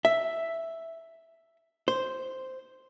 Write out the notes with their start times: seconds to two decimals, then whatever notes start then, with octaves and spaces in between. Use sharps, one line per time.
0.05 E5
1.88 C5